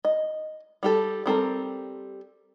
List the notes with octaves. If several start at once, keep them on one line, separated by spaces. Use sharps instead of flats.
D#5
G3 G4 A4
G3 C4 A4 A#4